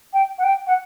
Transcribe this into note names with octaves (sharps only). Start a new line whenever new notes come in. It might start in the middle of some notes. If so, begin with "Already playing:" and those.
G5
F#5
G5
F#5